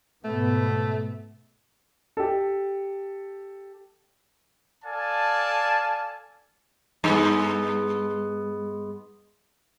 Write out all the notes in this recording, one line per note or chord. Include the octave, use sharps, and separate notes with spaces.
G#2 B2 A3 B3
G4 A4
A4 D5 F5 G#5 A5
G2 G#3 B3